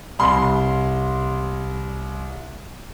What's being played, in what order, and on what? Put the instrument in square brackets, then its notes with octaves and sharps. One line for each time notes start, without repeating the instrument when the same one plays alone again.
[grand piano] C2 C6